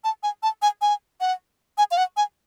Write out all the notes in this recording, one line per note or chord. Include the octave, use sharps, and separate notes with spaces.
A5
G#5
A5
G#5
G#5
F#5
G#5
F5
F#5
G#5